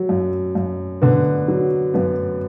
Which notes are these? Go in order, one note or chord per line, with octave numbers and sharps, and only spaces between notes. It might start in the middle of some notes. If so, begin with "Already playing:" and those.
Already playing: F#3
F#2
F#2
D3 B3
F#3
F#2 B3